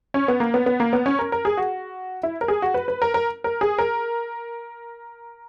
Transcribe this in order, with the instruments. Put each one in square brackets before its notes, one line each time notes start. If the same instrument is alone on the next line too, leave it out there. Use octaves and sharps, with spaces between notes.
[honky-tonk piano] C#4
B3
A#3
B3
B3
A#3
B3
C#4
A#4
A#4
G#4
F#4
E4
A#4
G#4
F#4
B4
B4
A#4
A#4
A#4
G#4
A#4